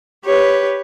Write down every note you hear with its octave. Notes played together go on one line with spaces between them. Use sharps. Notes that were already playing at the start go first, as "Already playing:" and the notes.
G4 B4 C#5